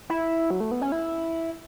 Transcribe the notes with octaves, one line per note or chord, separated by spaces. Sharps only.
E4
F#3
A3
B3
C#4
E4